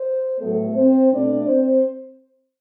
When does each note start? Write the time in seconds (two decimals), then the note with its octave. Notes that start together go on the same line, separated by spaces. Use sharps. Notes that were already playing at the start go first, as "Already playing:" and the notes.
Already playing: C5
0.39 A2 F#3 A3 B3 A4
0.75 C4 C5
1.11 B2 A3 C4 D4 D5
1.46 C4 C5